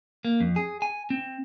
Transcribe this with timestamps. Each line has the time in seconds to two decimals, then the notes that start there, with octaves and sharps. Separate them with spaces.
0.25 A#3
0.40 F2
0.56 G#4
0.82 G#5
1.10 C4